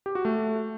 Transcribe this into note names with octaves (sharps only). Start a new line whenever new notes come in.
G4
F#4
A3